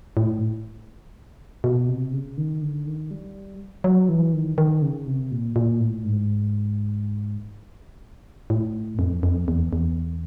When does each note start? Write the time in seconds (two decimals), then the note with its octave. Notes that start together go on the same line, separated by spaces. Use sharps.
0.17 A2
1.64 B2
1.89 C3
2.13 C#3
2.37 D#3
2.62 D3
2.87 D#3
3.11 G3
3.84 F#3
4.09 E3
4.33 D#3
4.58 D#3
4.82 C#3
5.07 C3
5.31 A#2
5.56 A#2
5.80 A2
6.05 G#2
8.50 A2
8.99 F2
9.23 F2
9.48 E2
9.73 E2